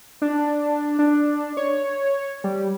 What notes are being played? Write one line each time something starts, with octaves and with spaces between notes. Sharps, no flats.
D4
D4
C#5
G3